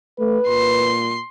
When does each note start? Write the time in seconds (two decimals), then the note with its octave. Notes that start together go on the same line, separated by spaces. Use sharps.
0.19 A3 B4
0.48 A#2 C6